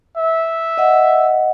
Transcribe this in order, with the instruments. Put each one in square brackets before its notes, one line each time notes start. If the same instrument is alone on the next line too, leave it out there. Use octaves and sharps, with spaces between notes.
[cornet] E5
[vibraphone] D#5 F#5